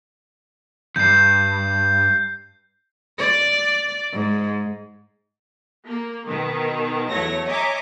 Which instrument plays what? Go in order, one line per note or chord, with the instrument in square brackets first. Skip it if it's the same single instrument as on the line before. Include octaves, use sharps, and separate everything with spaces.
[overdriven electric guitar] E2 G2 [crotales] G6 C7
[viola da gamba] D5
G#2
[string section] A#3
B2 D#3
E2 F#3 A3 C#5 A#6
C#5 D#5 E5 G#5 A#5 D6